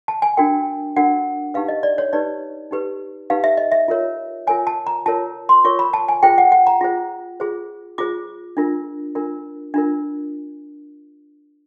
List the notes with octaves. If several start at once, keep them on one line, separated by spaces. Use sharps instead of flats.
A5
G#5
D4 F#4 A#4 G5
D4 F#4 A#4 F#5
D#4 G4 B4 F5
D#5
D5
C#5
D#4 G4 B4 D5
D#4 G4 B4
D#4 G4 B4 F5
E5
D#5
E5
F4 A#4 C#5
F4 A#4 C#5 G#5
A5
A#5
F4 A#4 C#5 A5
C6
F4 A#4 C#5 C#6
B5
A5
G#5
F4 G#4 C5 G5
F#5
F#5
A#5
F4 G#4 C5
F4 G#4 C5
F4 G#4 C5 D6
D4 F4 A#4
D4 F4 A#4
D4 F4 A#4